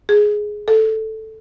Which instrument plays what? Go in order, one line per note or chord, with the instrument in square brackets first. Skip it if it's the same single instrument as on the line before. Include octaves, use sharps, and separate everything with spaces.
[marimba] G#4
A4